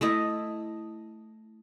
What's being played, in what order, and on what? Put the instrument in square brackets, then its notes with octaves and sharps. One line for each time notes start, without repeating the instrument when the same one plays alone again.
[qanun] A3 E4 D#5